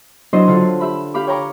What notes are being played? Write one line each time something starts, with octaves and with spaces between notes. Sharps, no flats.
F#3 D4 E4 C5 D#5 C6
D3 F4 A4
G4 E5 B5
G4 F5 G5 B5 D6
C#5 G5 A#5 C#6 D6